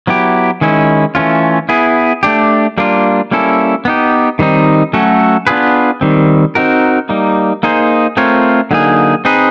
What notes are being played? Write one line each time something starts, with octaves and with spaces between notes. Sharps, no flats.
F#3 B3 E4 G4
D#3 G#3 C#4 E4
E3 A3 C#4 F4
B3 E4 G#4
A3 D4 G4
G3 A#3 D4 F4
G3 A#3 C#4 E4 A4
B3 D#4 G4
D#3 G3 C4 D#4
F#3 A3 C#4 F#4 A4
B3 D4 F4 G#4 B4
D#3 G3 C4
C4 D#4 F#4 A#4
G3 A#3 D#4
A#3 D#4 G#4 C5
A3 C4 F4 A#4 C#5
D3 F#3 A#3 D#4 G#4
C4 D#4 G#4 B4